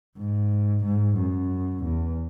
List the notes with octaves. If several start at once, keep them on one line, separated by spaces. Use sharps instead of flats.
G#2
G#2
F#2
E2